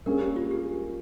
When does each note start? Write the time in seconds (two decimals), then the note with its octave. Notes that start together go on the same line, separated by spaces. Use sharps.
0.06 G3 A#3 C#4 G#4 A#4
0.21 G4
0.36 F4
0.51 G4